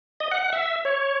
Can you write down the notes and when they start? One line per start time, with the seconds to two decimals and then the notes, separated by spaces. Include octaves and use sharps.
0.20 D#5
0.31 F#5
0.42 F#5
0.53 E5
0.85 C#5